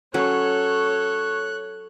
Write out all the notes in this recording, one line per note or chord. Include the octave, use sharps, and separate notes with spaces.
F#3 C#4 A4 C#5 F#6